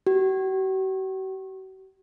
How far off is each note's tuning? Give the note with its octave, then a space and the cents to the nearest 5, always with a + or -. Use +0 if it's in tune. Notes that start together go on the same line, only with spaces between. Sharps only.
F#4 +45